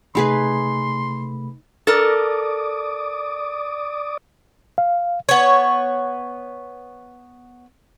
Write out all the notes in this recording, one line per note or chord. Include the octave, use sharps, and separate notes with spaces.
C3 A3 D#4 G#4 B4 B5 C6
A4 A#4 D5 D6 D#6
F5
B3 C#5